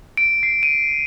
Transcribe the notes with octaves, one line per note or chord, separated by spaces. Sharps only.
D7
C7
D#7